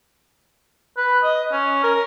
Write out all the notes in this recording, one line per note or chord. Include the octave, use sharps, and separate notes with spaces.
B4
D#5
C#4
A#4